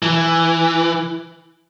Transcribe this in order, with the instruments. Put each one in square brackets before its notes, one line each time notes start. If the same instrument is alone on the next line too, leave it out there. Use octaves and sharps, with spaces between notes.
[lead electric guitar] E3